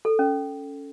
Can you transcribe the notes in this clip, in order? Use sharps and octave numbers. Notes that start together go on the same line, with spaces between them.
A4
C#4